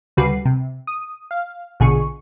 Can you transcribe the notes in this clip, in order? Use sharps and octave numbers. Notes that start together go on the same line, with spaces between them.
D2 C#3 G3 F#4 B4 C7
C3
D#6
F5
A#1 B2 D3 G#4 C#6